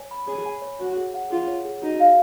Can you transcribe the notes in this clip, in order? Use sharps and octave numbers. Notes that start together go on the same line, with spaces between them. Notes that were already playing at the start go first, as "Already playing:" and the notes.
Already playing: C#5 G#5
B5
G#4 C#5
G#5
C#5
F#4 C#5
G#4
F#5
F4 G#4
C#5
G#4
D#4 F#4
F5